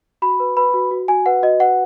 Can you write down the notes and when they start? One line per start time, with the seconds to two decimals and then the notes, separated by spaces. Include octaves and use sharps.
0.22 F#4 B5
0.40 B4
0.57 B4 B5
0.74 F#4
0.91 F#4
1.08 F#4 G#5
1.26 B4 F#5
1.43 F#4 D#5
1.60 B4 F#5